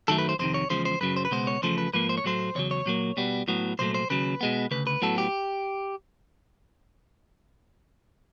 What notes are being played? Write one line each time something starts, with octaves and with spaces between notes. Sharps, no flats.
F#2 D#3 F#3 A3 A4
B4
C5
F2 C3 D#3 C5
C#5
E2 C#3 F3 G#3 C5
C5
F#2 C#3 F#3 B4
C5
B4
C#2 B2 G#3 B3 C5
C#5
E2 C#3 F3 A3 C5
B4
G#2 F3 A#3 B4
C5
C#5
A2 F#3 A3 C5
E2 C#3 F#3 C#5
C#5
A#2 F#3 A#3
B2 G3 B3
A2 F#3 B3
C2 A#2 F#3 A3 C5
C5
D#2 C#3 F#3 B4
B2 G#3 B3
D2 C#3 B4
B4
A2 F#3 B3 A4
G4